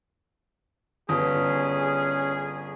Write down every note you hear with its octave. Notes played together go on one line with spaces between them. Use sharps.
G1 C#4 G#4 D#6